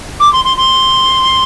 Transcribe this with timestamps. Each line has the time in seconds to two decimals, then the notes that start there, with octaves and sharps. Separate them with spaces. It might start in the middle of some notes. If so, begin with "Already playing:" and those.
0.19 D6
0.32 C6
0.44 C6
0.57 C6